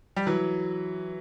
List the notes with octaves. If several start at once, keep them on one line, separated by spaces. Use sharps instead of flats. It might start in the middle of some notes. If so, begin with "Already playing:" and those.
G3
E3 F#3